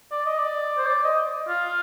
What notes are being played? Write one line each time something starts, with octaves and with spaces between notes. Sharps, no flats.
D5
D#5
D5
C5
D5
D#5
F4